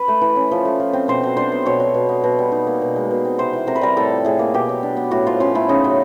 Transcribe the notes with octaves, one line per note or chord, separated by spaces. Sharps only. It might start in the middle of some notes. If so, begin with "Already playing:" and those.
Already playing: B4
A3
E3
C#4
F3
A3
F3
C4
B2 C5
F#3
D4 C5
B3
B2 C#5
F#3
B2
B3
B2
G3
D#4
A#3
B2
G#3
B2
C4
C3 C5
E3
C3 A#4
B4
G3 A#4
A2 A4
F3
A2 G#4
A#3
B2 G4
F#3
D4
B3
A2 F#4
F3 F4
C#4 F4
A3 E4
C#3 D#4
F#3